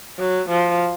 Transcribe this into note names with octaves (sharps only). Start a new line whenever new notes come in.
F#3
F3